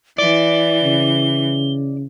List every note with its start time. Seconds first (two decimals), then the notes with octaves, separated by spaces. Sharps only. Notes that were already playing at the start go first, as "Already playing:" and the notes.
0.18 E3 D5 G7
0.83 C#3